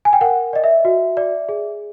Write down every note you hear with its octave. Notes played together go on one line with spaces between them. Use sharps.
G#5
G5
A#4 F#5
D5 D#5
E5
F#4
D5
G#4